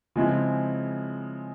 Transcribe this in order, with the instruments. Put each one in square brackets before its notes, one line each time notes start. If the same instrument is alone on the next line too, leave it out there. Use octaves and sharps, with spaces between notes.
[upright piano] C#3 F3 G#3 C4 E4